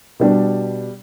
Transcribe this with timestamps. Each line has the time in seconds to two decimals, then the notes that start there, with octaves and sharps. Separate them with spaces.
0.20 B2 G3 D4